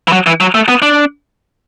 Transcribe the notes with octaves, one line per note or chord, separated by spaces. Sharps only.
E3
F#3
E3
F#3
A3
B3
D4